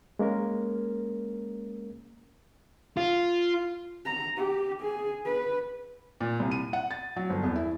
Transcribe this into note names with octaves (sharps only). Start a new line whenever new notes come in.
G#3 A#3 C#4 A#4
F4
A#5
G4
G#4
B4
A#2
C2
D#7
F#5
A6
F#3
G1
E2
E4